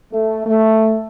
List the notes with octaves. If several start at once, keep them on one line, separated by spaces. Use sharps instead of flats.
A3
A3